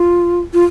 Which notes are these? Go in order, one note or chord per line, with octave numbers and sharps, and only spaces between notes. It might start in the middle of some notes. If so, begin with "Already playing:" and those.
Already playing: F4
F4